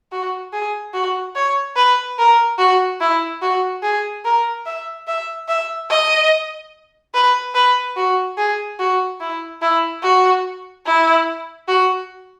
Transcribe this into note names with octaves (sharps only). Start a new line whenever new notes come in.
F#4
G#4
F#4
C#5
B4
A#4
F#4
E4
F#4
G#4
A#4
E5
E5
E5
D#5
B4
B4
F#4
G#4
F#4
E4
E4
F#4
E4
F#4